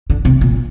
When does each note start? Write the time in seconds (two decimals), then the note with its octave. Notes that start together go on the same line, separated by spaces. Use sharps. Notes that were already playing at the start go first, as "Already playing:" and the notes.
0.10 D3
0.25 C3
0.41 A#2